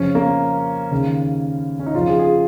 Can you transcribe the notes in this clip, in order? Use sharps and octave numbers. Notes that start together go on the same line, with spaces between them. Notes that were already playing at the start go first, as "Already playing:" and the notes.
Already playing: F2 C#3 C#4
A#3
D#2 C#3
C#4
D#4
F2 C#3 F4
G#4
G#4